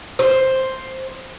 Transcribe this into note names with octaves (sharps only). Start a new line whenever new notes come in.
C5